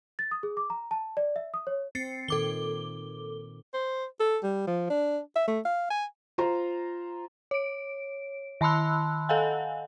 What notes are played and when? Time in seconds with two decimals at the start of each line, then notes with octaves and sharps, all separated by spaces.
0.19 A6
0.31 D#6
0.43 G#4
0.57 D6
0.70 A#5
0.91 A5
1.17 D5
1.36 E5
1.54 D#6
1.67 C#5
1.95 C4 A6 C7 C#7
2.28 A#2 D#3 A4 D6 G7
3.74 C5
4.20 A4
4.43 G3
4.67 F3
4.90 D4
5.36 E5
5.48 A3
5.65 F5
5.91 G#5
6.38 F4 C5 A#5
7.51 C#5 D7
8.61 D#3 A5 B5 C6 E6 F#6
9.29 A4 D#5 F5 F#5 G#5